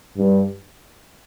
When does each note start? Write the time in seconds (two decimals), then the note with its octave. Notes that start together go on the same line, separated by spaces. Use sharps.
0.17 G2